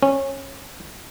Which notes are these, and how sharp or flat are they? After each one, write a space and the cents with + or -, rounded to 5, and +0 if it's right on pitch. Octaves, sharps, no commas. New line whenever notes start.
C#4 -20